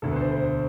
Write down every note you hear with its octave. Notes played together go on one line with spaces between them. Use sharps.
E1 D2 D3 A4
B4
C5
C5